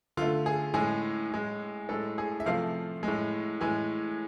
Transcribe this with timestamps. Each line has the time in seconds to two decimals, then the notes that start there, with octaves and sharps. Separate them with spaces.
0.17 D3 A3 F4
0.46 G#4
0.74 A2 G#3 G#4
1.31 A2 G#3
1.89 A2 G#3 A4
2.18 G#4
2.40 E5
2.46 C3 F3 A3 F5
3.03 A2 G#3
3.61 A2 E3 G#3 G#5